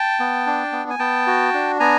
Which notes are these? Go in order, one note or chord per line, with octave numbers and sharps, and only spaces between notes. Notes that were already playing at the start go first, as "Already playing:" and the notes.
Already playing: G5 A5
B3
D4
B3
G#5
B3 G5 A5
F#4
D4
B3 G#5 A#5